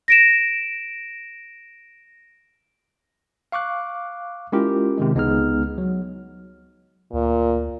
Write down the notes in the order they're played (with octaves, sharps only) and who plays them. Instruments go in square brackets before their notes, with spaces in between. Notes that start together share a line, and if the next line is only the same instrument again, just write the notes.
[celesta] A#6 D7 E7
[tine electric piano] F5 C#6 D6 F#6
G#3 C#4 E4 F4 G4 A#4
C3 D#3 G#3
C#2 G#3 B3 D#4 G#4 F6
F#3
[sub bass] D2 [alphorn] A#2